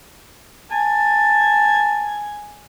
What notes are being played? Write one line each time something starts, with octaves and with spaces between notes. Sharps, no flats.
G#5 A5